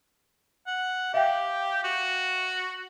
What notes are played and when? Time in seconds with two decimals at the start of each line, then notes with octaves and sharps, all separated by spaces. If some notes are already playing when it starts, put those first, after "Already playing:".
0.67 F#5
1.14 G4 E5 F5 G5
1.84 F#4